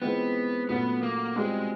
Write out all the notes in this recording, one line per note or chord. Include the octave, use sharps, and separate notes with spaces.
E3 G#3 B3 C4 F4
A#2 F#3 A3 B3 C#4 F#4
A#3
B2 G3 G#3 C4 F4 G#4